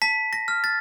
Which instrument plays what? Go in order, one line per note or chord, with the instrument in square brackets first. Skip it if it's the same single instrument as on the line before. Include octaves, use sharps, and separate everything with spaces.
[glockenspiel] A5 B6
A#6
F6
A6